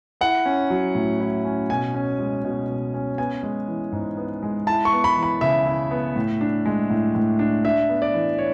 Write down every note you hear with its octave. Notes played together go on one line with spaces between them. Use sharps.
E4 F#5
C#4
F#3
A2
E4
C#4
B2 G#5
C#4
G#3
B2
B2
C#4
B3 G#5
G#3
E3
G#2
B3
G#3
E4 A5
C#6
B3
B5
E3
B5
C#3 E5
E4
B3
A2
D4
G#3
A2
A2
D4
D4 E5
B3
D5
E3
C#5